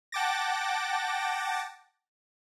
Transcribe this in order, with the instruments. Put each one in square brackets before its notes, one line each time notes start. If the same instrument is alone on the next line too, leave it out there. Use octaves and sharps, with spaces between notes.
[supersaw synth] F#5 G5 A5 D6 A6 A#6